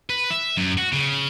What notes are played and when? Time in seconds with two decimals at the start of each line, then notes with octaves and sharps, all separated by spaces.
0.09 B4
0.31 E5
0.57 F#2
0.77 F#4
0.92 C#3